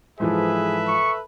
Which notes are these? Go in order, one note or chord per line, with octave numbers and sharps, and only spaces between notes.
G#2 E3 F3 G#4 A4 B4 E5
C#6